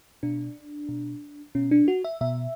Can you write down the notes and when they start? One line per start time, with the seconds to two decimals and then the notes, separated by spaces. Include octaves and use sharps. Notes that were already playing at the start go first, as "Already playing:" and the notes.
0.23 B2 D4
0.89 B2
1.55 B2 C#4
1.71 D4
1.88 F#4
2.04 E5
2.21 B2 E5